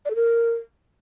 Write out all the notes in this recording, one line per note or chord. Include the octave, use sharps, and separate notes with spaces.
D5
A4
A#4